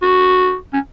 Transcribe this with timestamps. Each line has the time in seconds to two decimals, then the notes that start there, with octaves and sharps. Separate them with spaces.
0.02 F#4
0.73 C#4